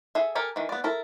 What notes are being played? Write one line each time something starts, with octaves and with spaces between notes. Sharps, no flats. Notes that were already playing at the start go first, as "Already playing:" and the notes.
G#4 A4 E5
G4 A4 A#4 G#5
D#3 E3
B3 D5
E4 A4 A#4